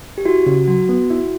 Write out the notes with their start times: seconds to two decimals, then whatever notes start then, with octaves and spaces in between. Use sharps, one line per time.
0.18 G4
0.25 E4 F#4
0.46 C#3 F#4
0.67 F#3 F#4
0.89 B3
1.10 E4